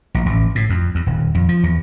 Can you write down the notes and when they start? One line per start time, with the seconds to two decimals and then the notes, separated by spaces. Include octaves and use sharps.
0.15 A#1
0.26 A1
0.55 A2
0.70 F2
0.95 E2
1.06 D#1
1.35 F2
1.49 F3
1.63 E2